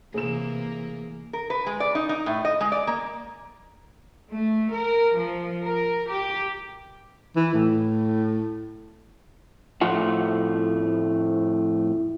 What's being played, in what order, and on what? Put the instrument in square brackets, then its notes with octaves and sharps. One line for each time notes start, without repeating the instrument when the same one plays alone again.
[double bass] C3 E3 [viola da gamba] A#3 [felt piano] G#4 E7
[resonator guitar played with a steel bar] A#4
B4
G#3
D5
D#4
D#4
A2
D#5
G#3
D5
A#3
[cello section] A3
A#4
F3
A#4
G4
[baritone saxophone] E3
A2
[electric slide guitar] F2 A2 A3 F4 F#5